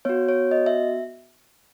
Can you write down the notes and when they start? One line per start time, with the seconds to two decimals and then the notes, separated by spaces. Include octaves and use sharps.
0.05 B3 F#4 C#5
0.29 C#5
0.51 D#5
0.66 E5